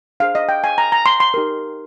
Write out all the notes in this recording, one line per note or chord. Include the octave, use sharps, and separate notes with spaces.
D4 G#4 C5 F5
D#5
G5
G#5
A#5
A#5
C6
C6
D#4 G4 A#4